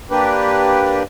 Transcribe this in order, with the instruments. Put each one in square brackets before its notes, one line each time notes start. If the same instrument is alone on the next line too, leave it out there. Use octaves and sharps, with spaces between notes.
[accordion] A#3 D4 G4 B4